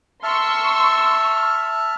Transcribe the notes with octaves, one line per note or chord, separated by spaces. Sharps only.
E5 A5 C6 C#6 E6 F6